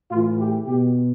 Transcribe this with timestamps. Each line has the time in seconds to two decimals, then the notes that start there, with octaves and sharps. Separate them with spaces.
0.11 A2 E3 F4
0.39 G4
0.67 B2 G4